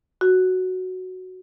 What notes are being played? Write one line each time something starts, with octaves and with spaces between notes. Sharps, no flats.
F#4